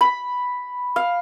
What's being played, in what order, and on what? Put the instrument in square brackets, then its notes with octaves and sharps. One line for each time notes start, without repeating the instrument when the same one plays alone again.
[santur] B5
F5